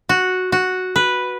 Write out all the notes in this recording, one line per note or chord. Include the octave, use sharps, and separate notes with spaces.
F#4
F#4
B4